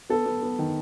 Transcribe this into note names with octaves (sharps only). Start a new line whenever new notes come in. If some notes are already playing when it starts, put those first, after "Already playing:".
B3 A4
B3
B3
D#3